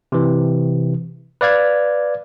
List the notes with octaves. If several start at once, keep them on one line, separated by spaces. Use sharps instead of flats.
C3 E3
B4 D5 F5 G#6